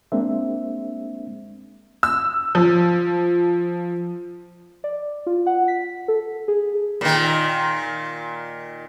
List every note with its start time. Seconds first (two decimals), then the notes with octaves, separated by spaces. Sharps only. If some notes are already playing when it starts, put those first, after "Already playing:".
0.12 G#3 A#3 C4 D4 E5
2.03 E6
2.55 F3
4.84 D5
5.26 F4
5.46 F#5
5.68 B6
6.08 A4
6.48 G#4
7.01 A#2 D#3